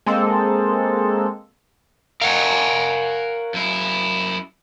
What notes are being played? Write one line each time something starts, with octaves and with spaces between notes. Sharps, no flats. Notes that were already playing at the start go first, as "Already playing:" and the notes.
G#3 A#3 C4 A4
A#4 C#5 F5 F#5 G#5
F#2 E4